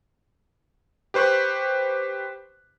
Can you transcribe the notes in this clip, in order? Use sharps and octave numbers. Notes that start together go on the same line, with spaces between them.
G4 B4 C5 C#6 F#6